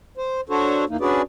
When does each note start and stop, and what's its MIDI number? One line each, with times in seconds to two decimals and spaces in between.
0.18 0.41 72
0.49 0.85 62
0.49 0.85 66
0.49 0.85 69
0.49 0.85 72
0.49 0.85 73
0.89 0.97 40
0.89 0.97 52
0.89 0.97 58
0.89 0.97 63
1.00 1.22 61
1.00 1.22 62
1.00 1.22 66
1.00 1.22 68
1.00 1.22 71
1.00 1.22 74